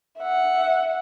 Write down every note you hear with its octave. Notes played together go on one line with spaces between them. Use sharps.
E5 F#5